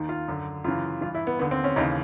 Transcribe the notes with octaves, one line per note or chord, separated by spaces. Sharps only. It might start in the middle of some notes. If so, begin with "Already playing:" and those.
Already playing: D#2 D#3
F4
F#2 D3
F#2 C#3 E3 F4
G2 E3 F4
E4
B3
D#2 D3 B3
C4
C#4
D#2 C#3 E3 D#4